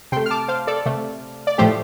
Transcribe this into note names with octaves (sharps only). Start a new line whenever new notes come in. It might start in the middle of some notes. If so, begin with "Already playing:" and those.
C3 A3 G5 C6
F6
A5 D6
C5 F5
A4 D5
C3 A3
D5
A2 F3 A3 G4 C5